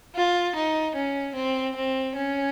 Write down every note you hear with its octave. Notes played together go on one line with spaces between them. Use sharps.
F4
D#4
C#4
C4
C4
C#4